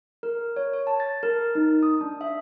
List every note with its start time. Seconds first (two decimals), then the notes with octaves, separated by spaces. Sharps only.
0.23 A#4
0.56 C#5
0.73 C#5
0.87 A5
1.00 A6
1.23 A#4
1.55 D#4
1.83 D#6
2.01 D4
2.21 E5